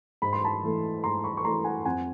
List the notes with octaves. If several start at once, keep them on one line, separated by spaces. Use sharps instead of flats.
G#2 B5
C6
A5 B5
E3 A3
G#2 A#5 C6
B5 C#6
C#6
E3 A3 A#5 C6
F#5 G#5
F2 F#5 G#5